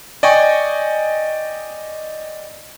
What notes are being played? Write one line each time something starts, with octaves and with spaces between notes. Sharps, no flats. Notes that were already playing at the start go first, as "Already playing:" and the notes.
D5 D#5 G5 G#5 C#6